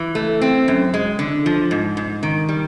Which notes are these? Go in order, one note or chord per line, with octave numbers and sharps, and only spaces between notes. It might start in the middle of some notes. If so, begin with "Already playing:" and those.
Already playing: E3
A3
C4
F#2
G#3
D3
F3
G#2
G#2
D#3
G3